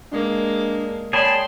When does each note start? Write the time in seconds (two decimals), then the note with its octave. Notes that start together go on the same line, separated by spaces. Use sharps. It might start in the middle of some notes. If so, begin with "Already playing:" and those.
0.12 G#3 A#3 D4
1.13 G#4 C#5 D5 G5 A5 B5 C6